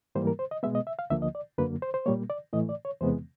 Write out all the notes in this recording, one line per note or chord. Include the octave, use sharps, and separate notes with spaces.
G#2 E3 G3 A#3 C5
A#4
C5
D#5
B2 G#3 B3 E5
D#5
E5
F5
D2 D3 F3 A#3 E5
D#5
D5
F#2 D3 F#3 A#3 B4
C5
C5
A#2 G3 A#3 C#5
D5
A2 E3 A3 D#5
D5
C#5
E2 C3 E3 G#3 B3 C5